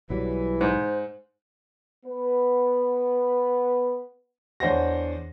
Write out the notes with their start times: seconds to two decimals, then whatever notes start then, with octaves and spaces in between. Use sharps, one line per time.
0.10 B1 E3 F#3 G3
0.61 G#2 C5
2.06 B3 B4
4.60 E2 D4 C5 C#5 F#5 A#6